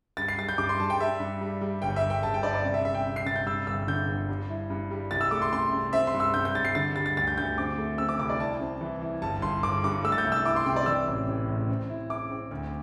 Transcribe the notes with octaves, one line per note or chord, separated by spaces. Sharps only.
G2 A6
C7
G3 A6
G6
G2 D6
C6
G2 A5
G5
G3 E5
G2
G3
G3
G1 G5
E5
G1
G5
G1 A5
G5
G2 D5
D5
C3
E5
C3 E5
G5
C3
C7
C3 A6
G6
G2 E6
G1 E6
D3 G6
G1
G2
E4
G2
G3
C2 A6
E6
A3 D6
C6
C3 C6
C3
C4 E5
C6
G2
E6
G2 G6
G6
G2 A6
C7
D3 A6
G3 A6
A6
D2 A6
G6
D2 G6
C4 D6
A3
C4 E6
D6
C2 D6
D5
E4 A5
C4
E3
E4
G1 A5
G1 C6
G1 D6
G2 D6
A3 E6
A6
G6
C2
E6
E4 D6
C6
C3 G5
D5
E3 E6
A1
A2
A1
C4
E4
E4 D6
C4
D2